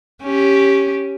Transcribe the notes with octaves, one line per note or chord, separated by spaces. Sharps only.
C#4 G4